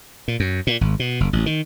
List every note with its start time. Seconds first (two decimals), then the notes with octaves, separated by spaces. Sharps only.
0.28 A#2
0.40 F#2
0.67 A#2
0.81 G#1
1.00 B2
1.20 F#1
1.33 A1
1.46 D#3